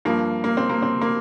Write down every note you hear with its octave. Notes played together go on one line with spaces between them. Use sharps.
G2 F3 A#3
A#3
C4
A#3
C4
A#3